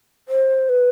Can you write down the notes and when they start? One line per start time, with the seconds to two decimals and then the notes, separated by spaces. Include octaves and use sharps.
0.28 C5
0.69 B4